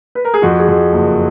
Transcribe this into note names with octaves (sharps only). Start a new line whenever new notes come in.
B4
A#4
G#4
F2 F#4
G#4
F2
F#1